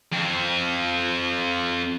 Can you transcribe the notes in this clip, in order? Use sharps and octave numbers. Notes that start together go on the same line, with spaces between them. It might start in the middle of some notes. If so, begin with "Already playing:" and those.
F2 C4